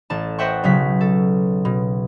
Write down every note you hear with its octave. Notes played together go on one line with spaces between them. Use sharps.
A1 A5
C5 D#5 E5 F#5 G5 C#6
B1 C#3 F#3 B6
A4
B2